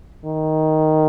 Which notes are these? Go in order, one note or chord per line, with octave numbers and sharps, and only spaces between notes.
D#3